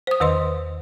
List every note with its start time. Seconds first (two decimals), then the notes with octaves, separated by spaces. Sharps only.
0.07 C5 D#6
0.20 E2 D#3 B4 D#5 C6